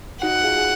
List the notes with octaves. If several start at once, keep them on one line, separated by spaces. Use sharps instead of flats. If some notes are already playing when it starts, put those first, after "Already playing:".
D#4 F#4 F#5
F4 G#4
G#4